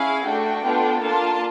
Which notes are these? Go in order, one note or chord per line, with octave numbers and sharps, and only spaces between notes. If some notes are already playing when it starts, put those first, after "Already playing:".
Already playing: C#4 E4 G#4 F5
A3 D4 F#4 G5
B3 D4 F4 A4
A#3 D4 F4 A5